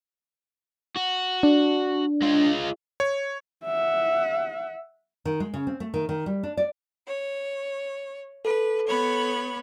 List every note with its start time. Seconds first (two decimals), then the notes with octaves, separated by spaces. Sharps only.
0.97 F#4
1.43 D4
2.22 G#3 F4
3.00 C#5
3.64 E5 F#5
5.25 D#3
5.40 G#3
5.54 C#3
5.67 C4
5.80 A3
5.94 D#3
6.09 D#3
6.26 G3
6.43 D4
6.57 D5
7.07 C#5
8.45 A4 B4
8.88 B3 C#5 B5